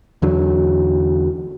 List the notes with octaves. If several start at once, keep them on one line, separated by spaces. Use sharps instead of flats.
E2 D3 F#3